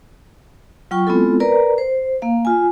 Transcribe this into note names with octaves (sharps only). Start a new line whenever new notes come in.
F#3 F4 G5 C#6
G#3 B3 C4 E4 F4 A4
A#4 B4 D5 A#5
C5
A#3 F5
F4 G#5